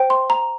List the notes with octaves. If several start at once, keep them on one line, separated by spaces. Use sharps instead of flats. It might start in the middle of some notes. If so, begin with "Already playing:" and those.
Already playing: C5 G5
C6
A#5